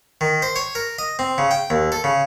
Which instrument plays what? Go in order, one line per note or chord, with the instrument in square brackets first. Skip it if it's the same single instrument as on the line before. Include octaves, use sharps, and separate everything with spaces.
[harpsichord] D#3
C5
C#5
A#4
D#5
C4
C#3
G5
D#2
A4
C#3